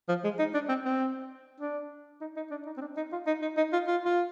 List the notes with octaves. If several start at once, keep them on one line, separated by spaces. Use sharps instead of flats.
F3
G#3
D#4
D4
C4
C4
D4
D#4
D#4
D4
D#4
C4
D4
D#4
F4
D#4
D#4
D#4
F4
F4
F4